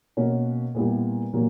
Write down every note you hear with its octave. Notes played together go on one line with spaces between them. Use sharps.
B2 A#3 C#4 F#4
A#2 G3 B3 E4 G4
A#2 F#3 A#3